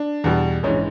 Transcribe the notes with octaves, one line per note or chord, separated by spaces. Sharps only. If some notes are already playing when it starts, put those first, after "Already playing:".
Already playing: D4
E2 B2 G3
A#1 G#2 E3 C#4